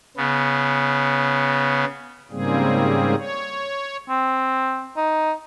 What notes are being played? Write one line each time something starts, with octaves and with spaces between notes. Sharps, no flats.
C#3 B3
G#2 C#3 G3 A#3 C4 G#4
C#5
C4
D#4